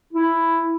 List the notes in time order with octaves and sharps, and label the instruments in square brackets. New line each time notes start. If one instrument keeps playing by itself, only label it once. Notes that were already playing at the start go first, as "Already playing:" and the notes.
[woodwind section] E4